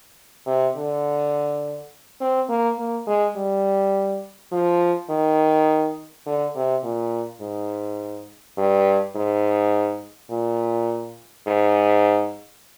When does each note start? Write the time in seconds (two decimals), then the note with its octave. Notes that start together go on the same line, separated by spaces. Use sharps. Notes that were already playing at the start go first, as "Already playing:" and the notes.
0.46 C3
0.76 D3
2.21 C4
2.49 A#3
2.78 A#3
3.07 G#3
3.36 G3
4.52 F3
5.10 D#3
6.26 D3
6.55 C3
6.84 A#2
7.41 G#2
8.58 G2
9.15 G#2
10.30 A#2
11.47 G#2